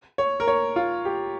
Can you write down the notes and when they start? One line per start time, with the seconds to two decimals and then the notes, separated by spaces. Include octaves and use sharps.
0.18 C#5
0.40 A#4
0.48 C#5
0.76 F4
1.05 G4